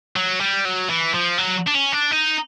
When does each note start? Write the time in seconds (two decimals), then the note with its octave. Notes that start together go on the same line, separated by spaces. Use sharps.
0.16 F#3
0.40 G3
0.65 F#3
0.90 E3
1.14 F3
1.38 F#3
1.67 D4
1.75 C#4
1.93 D4
2.12 D#4